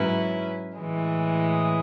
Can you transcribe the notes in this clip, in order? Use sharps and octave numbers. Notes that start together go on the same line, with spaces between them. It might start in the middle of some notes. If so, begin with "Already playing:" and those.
Already playing: G#2 F#3 C#4 E4 B4
A2 E3 G#3